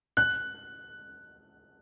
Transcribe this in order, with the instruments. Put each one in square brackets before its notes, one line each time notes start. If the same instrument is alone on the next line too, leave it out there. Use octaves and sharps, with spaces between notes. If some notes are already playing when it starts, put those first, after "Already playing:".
[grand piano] F#6